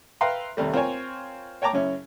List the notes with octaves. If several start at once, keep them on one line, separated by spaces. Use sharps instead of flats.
B4 E5 F5 G5 A#5 C6
D#2 C3 G3 A3
C4 F4 A#4 C5 C#5 G#5
C#5 G5 A5 A#5 D6
F#2 C#3 C#4 E4